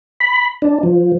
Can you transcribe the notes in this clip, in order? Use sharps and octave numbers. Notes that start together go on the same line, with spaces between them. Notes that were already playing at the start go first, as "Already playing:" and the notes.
B5
D4
F3